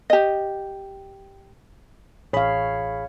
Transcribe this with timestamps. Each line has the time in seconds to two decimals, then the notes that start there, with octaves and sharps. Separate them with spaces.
0.10 G4 D#5
2.33 A1 G#4 C#5 F5 B5